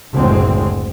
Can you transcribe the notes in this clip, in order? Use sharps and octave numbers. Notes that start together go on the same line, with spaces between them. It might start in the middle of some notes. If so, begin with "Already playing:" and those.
F#1 D2 A2 E3 G#3 C4